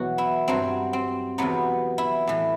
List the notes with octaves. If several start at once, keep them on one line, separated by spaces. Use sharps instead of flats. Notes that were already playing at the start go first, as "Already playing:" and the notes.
Already playing: E2 B2 F#3 F#4
E4
G2 F#3 C4
C4
E2 C3 F#3 B3
E4
A2 E3